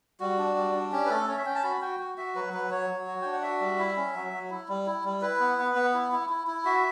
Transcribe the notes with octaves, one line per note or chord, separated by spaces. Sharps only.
G3 F#4
D4
G3
D4
C#4 G4
B4
A3 A4
C#4 C#5
E5
C#4 G5
A5
F#4 B5
F#4 G5
F#4
F#4 E5
F#3 B4
F#3 B4
F#3 C#5
F#3
F#4
D4 G5
F#5
F#4 E5
G3
E4
C#4
F#3
F#3
E4
G3
E4
G3
E4 B4
B3
B3
B3
E4
E4
E4
E4
F#4 E5